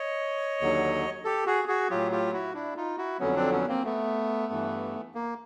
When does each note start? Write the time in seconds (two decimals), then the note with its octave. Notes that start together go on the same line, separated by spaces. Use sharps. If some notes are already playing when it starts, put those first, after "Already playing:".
Already playing: C#5 D#5
0.61 D#2 D3 F#3
1.24 G4 A4
1.46 F#4 G#4
1.68 F#4 G#4
1.90 A2 F#3 F4 G4
2.11 F4 G4
2.33 E4 F#4
2.55 D4 E4
2.77 D#4 F4
2.98 E4 F#4
3.19 F2 D3 F#3 B3 C#4
3.36 C4 D4
3.52 B3 C#4
3.68 A#3 C4
3.85 A3 B3
4.50 G2 E3
5.15 A#3